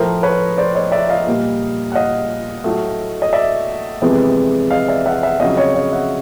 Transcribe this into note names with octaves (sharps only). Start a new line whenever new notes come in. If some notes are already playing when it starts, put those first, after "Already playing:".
Already playing: A2 F3 A3 A#4 C5
B4 C#5
C5 D5
C#5 D#5
D5 E5
D#5 F5
A#2 G3 A#3
F#5
D#5 F5
A2 F#3 A3
D#5
D5 E5
F2 C3 E3 G#3 B3
D#5 F5
D5 E5
E5 F#5
E5 F#5
F2 C#3 F#3 D#5 F5
C#5 D#5
D#5 F5
E5 F#5